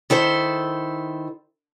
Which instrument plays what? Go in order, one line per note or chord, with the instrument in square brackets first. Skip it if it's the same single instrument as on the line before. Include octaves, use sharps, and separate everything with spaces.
[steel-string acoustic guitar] D#3 E4 A4 C5